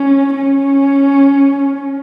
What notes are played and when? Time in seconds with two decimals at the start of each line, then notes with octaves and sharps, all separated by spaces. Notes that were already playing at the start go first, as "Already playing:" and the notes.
Already playing: C#4
0.36 C#4